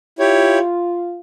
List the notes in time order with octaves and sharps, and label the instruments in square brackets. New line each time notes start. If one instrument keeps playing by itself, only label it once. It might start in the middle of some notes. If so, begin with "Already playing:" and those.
[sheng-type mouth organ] E4 G4 C#5 [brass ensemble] F4